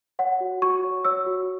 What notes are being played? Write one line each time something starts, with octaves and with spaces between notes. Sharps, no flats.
C#5 F#5
F#4
F#4 C#6
C#5
C#5 E6
F#4